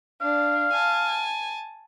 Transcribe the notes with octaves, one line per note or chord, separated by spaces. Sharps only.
D4 F5
G#5 A5